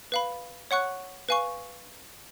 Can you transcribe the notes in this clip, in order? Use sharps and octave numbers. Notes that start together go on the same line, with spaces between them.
B4 F5 B5
C#5 F#5 C#6 F#6
B4 F5 G#5 C#6